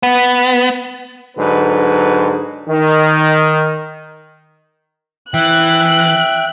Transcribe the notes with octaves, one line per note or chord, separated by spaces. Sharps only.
B3
G#2 D3 F#3 B4
D#3
E3 E5 G5 F#6